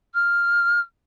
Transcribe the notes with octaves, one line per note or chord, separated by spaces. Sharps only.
F6